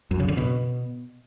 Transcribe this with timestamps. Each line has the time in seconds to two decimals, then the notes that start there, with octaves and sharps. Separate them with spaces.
0.11 F#2
0.20 C#3
0.28 D3
0.37 B2